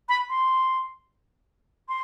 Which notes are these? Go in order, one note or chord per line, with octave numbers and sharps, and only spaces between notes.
B5
C6
C6